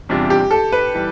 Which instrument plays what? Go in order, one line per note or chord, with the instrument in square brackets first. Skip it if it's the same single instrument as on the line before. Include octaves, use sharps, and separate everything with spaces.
[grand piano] E2 C3 G3 D4 F4
[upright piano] G4
A4
B4
[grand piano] E3 G3